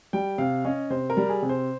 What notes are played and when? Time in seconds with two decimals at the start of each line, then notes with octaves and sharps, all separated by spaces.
0.13 G3 G5
0.38 C3 F5
0.65 C#4 D#5
0.90 C3 C5
1.10 A#4
1.17 G3
1.22 G4
1.29 G#4
1.42 C3
1.49 C5